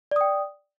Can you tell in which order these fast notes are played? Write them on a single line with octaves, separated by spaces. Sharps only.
D5 D#6 G5